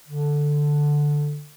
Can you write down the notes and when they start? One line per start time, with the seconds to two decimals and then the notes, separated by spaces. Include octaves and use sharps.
0.08 D3